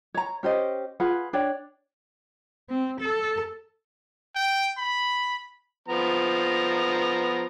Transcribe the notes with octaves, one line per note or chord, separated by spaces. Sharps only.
C#5 A#5
C#4 G4 C5 D#5
F4 G#4 B4 F#5
D4 C#5 D5 G5
C4
A4
G5
B5
F3 B3 A#5